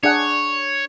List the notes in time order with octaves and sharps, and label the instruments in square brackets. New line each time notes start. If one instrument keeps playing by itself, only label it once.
[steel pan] D4 G#4 F#5 [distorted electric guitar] C#5